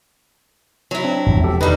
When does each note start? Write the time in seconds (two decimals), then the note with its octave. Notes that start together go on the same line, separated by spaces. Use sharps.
0.91 F#3 E4
1.04 C4 D4
1.26 E1 E2 F3
1.44 G4 A4
1.61 D#3 G3 B4 D#5 B5